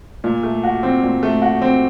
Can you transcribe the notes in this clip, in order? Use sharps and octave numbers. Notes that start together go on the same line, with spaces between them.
A#2
A3
F#4
C4
A#2
A3
F#4
C4